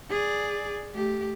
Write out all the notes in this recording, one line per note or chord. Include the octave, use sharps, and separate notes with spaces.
G#4 D5
A3 G4